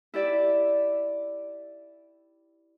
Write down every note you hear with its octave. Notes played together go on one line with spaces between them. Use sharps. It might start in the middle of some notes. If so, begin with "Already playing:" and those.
E4 G4 D5 E5